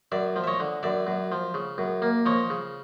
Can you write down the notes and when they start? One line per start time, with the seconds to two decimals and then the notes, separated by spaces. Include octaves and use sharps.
0.12 F#2 D5 E5
0.36 F3
0.44 E5
0.47 C#5 D#5
0.60 D3
0.83 F#2 D5 E5
1.07 F#2
1.32 F3
1.54 C#3
1.78 F#2
2.02 A#3
2.26 F3 C#5 D#5
2.50 C#3